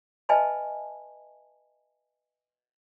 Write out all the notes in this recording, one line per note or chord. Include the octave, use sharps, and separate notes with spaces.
B4 D#5 E5 G#5 A5 B5